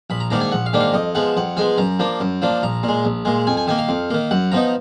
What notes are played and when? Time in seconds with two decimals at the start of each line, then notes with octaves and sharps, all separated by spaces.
0.10 A#1 B5
0.20 A#5
0.30 G#2 D#3 A#3 D4 A#5
0.41 G#5
0.52 A#1 F#5
0.66 F5
0.73 G#2 D#3 A#3 D4
0.80 F5
0.94 F2 D#5
1.15 F3 G#3 B3 F#5
1.37 F2 F#5
1.57 F3 G#3 B3 G#5
1.78 F#2 A#5
1.99 F3 A#3 D4
2.20 F#2
2.42 F3 A#3 D4
2.63 A#1 A#5
2.83 A#2
2.89 G#3
3.05 A#1
3.25 A#2 G#3
3.47 F2 G#5
3.57 G#5
3.67 D#3 A#3 G#5
3.79 F5
3.89 F2
4.10 D#3 A#3
4.31 F#2 F#5
4.51 F3 B3 D#4 A#5